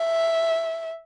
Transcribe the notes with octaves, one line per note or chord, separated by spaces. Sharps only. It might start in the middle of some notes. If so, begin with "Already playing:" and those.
Already playing: E5